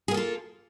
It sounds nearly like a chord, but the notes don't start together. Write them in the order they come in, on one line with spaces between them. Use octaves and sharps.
G#4 A#3 A4 F4